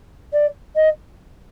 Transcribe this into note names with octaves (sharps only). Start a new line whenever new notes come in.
D5
D#5